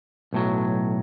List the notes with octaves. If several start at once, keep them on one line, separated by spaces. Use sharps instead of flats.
B1 A2 F#3